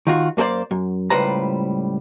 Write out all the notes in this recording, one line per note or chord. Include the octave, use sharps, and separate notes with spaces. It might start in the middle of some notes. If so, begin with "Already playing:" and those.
D#3 F4 F#4
F#2 A#3 A4 C5 D5
F#2
C#2 A2 G3 B4 C5 A#5